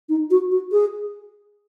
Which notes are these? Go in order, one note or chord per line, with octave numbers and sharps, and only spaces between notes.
D#4
F#4
F#4
G#4